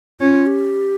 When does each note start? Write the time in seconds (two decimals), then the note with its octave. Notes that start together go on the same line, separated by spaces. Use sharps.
0.20 C#4 F4
0.46 G4